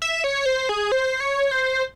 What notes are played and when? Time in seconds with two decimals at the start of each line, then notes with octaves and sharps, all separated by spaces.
0.02 E5
0.24 C#5
0.46 C5
0.69 G#4
0.92 C5
1.20 C#5
1.51 C5